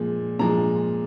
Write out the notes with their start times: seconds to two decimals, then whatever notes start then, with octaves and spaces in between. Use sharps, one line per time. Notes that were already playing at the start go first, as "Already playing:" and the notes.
Already playing: A#2 F3 G#3
0.39 A#2 F3 G#3 A#5